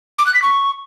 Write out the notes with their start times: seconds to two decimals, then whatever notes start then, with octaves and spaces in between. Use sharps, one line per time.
0.19 D6
0.26 F#6
0.34 B6
0.42 C#6